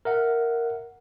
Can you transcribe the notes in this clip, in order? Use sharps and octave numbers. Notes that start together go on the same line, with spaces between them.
A#4 E5 F#5